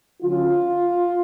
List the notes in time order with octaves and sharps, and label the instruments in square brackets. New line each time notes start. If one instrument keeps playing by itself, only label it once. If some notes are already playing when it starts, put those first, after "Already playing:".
[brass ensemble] D3 F#3 C#4 F4